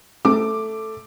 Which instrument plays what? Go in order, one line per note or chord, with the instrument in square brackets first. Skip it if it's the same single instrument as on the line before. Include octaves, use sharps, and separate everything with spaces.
[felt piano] A3 D6